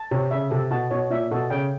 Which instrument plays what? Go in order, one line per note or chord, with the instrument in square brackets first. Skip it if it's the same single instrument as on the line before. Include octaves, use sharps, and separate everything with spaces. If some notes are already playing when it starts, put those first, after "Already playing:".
Already playing: [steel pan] A5
[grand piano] C3 [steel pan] C#5
[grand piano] C#3 [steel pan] E5
[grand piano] C3 [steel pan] A4
[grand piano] B2 [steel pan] A5
[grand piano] B2 [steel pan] C#5
[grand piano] A#2 [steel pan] E5
[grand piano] B2 [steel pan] A4
[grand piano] C#3 [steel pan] G5